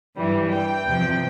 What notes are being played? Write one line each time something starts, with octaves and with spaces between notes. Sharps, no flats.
G2 E3 G3
G5
E2 C3 F3